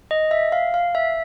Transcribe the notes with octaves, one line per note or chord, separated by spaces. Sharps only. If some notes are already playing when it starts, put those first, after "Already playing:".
D#5
E5
F5
F5
E5